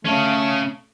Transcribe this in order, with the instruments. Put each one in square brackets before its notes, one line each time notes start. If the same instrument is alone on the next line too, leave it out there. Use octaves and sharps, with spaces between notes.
[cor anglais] A3 [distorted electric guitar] C#4 F5